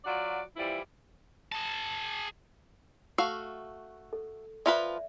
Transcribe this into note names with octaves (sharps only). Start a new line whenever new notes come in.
F#3 F4 F#4 D5
E3 F3 G3 E4 D5
G#4 A5
A3 F#4 F5
A4
F3 F4 B4 D5 E5